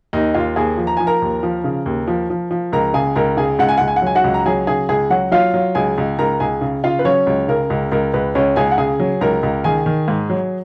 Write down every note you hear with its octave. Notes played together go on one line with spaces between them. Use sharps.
D#2 D#4 D#5
D#2 F4 F5
D#2 G#4 G#5
F3
A#5
F3 G#5
A#4 A#5
D#2
F3
C#3
D#2
F3
F3
F3
C#2 A#4 A#5
C#3 G#4 G#5
C#2 A#4 A#5
C#3 G#4 G#5
C#2 F#5
G#5
C#2 F#5
G#5
F#5
F#3 G#5
F#4 F#5
C#2
A#5
F#3 G#4 G#5
C#3 G#4 G#5
C#2 G#4 G#5
F#3 F#4 F#5
F#3 F4 F5
F#3
C#2 G#4 G#5
C#2
C#2 A#4 A#5
C#2 G#4 G#5
C#3
C#3 F4 F5
B4
F#3 C#4 C#5
C#2
C#3 A#4
C#2
C#2 A#4
C#2 B4
C#2 C#4 C#5
C#2 G#4 G#5
F#5
C#3 G#4 G#5
F#3
C#2 A#4 A#5
C#2
D#3 G#4 G#5
D#3
G#2
F#3